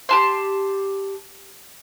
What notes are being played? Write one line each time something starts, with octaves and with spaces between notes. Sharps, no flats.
G4 A5 C6